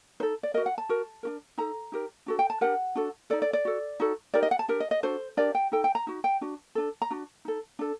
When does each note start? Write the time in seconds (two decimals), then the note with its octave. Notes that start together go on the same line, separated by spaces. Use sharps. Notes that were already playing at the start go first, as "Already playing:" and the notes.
0.20 D#4 C5
0.23 A4
0.43 D5
0.54 A#4 D#5
0.57 F#4
0.66 F#5
0.78 A5
0.89 F#4 A#4
1.23 D4 F#4 A#4
1.58 D#4 A4 A#5
1.92 D#4 G4 A#4
2.26 D4 F#4 A4
2.39 G5
2.50 A5
2.61 D4 G4 A#4 F#5
2.95 D4 F#4 A4
3.30 D#4 F#4 A4 D5
3.42 D5
3.53 D5
3.65 F#4 A4
4.00 D#4 F#4 A4
4.34 D#4 G4 A#4 D5
4.43 D#5
4.51 F#5
4.59 A5
4.68 D4 G4 A#4
4.80 D#5
4.91 D#5
5.03 D4 F#4 A4 C5
5.37 D4 G4 A#4 D5
5.55 G5
5.72 D#4 A4 G5
5.84 G5
5.95 A#5
6.07 D#4 F#4
6.24 G5
6.41 D4 F#4
6.75 D4 A4
7.02 A#5
7.10 D4 F#4
7.45 D#4 A4
7.79 D4 A4